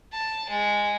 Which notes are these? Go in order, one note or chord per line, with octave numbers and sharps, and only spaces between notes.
A5
G#3